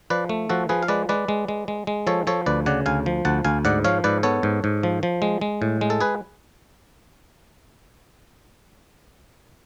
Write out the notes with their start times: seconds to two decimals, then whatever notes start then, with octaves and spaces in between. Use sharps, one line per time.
0.10 F3 B4 D5
0.29 A3
0.49 F3 F#4 A4
0.69 F3 G#4 B4
0.83 F5
0.88 G#3 B4 D5
1.09 G#3 B4 D5
1.28 G#3
1.48 G#3
1.68 G#3
1.87 G#3
2.07 F3 A4 C#5
2.27 F3 A4 C#5
2.46 D2 B4 D5
2.66 C#3 D5 F#5
2.86 D2 F5 G#5
3.06 F3
3.25 D2 F#5 A5
3.45 D2 F5 G#5
3.65 G#2 D5 F#5
3.84 F3 C#5 F5
4.04 G#2 B4 D5
4.23 B3 A4 C#5
4.43 G#2
4.64 G#2
4.83 F3
5.03 F3
5.22 G#3
5.41 G#3
5.62 A2
5.81 G#3
5.90 A4
6.00 G#4 B4